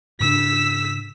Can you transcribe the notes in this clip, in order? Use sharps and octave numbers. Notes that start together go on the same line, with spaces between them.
G#2 C#3 D4 E6 B6